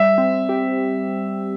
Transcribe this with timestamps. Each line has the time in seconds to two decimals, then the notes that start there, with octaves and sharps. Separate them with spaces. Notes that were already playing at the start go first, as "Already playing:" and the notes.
Already playing: G3 E5
0.18 C4
0.49 G4